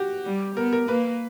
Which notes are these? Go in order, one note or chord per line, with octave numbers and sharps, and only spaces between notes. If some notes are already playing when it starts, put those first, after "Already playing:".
Already playing: F#4 G4
G3
B3 A#4
A#4
A#3 B4